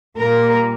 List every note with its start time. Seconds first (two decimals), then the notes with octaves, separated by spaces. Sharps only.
0.17 A#2 G3 A#3 A#4